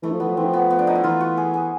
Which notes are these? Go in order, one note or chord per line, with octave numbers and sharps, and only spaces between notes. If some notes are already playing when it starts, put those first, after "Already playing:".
E3 A3
F3
E3 B3
F3
E3 C4
F3
B3
B3
D4
D#4
E4
E3 F4
F#4
G#4
G#4